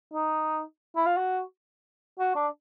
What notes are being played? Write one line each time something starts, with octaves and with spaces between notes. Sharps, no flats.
D#4
E4
F4
F#4
F#4
D4